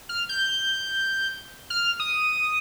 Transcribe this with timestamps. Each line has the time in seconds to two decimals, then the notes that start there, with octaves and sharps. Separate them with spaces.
0.09 F6
0.29 G6
1.70 F6
2.00 D#6